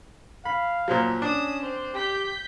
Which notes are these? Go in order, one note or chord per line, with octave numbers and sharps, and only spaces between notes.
F5 B5
A#2 F3 F#3
C#4 D4 D#6 E7
C4
G4 G6 B6